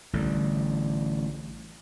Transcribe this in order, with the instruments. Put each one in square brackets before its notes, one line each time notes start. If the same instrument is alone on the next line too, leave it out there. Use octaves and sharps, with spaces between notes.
[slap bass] A1 D3 G3